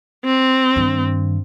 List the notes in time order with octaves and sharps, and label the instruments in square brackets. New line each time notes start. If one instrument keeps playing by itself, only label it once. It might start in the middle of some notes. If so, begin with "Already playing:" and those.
[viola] C4
[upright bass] G2 D#3